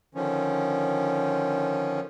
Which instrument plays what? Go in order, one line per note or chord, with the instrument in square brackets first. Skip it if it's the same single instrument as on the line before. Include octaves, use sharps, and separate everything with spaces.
[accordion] D3 D#3 F3 C#4